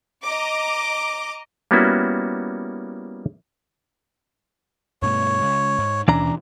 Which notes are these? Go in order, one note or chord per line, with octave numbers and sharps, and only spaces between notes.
D#5 A#5 D6
G3 A#3 B3 C#4 E4 F#4
G2 B2 A3 C#5
C#3 G#3
G#2
D#2 B2 E3 C#4 D4 A#5